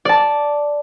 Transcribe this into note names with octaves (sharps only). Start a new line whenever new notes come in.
D5 A5